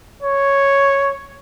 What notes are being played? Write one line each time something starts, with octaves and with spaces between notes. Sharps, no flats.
C#5